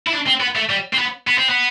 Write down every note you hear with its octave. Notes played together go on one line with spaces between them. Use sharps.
E4
D4
C4
B3
A3
G3
C4
B3
B3
C4
B3